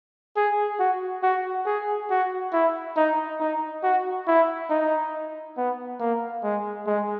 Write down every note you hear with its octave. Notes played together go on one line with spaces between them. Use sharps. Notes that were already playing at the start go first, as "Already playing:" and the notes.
G#4
F#4
F#4
G#4
F#4
E4
D#4
D#4
F#4
E4
D#4
B3
A#3
G#3
G#3